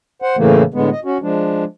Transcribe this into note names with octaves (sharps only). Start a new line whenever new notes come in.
C5 F#5
A2 C#3 E3 A3 A#3
A2 D3 G#3 B3
D#5
C#4 F#4
F3 G#3 D4